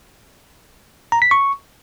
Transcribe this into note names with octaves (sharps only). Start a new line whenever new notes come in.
A#5
B6
C#6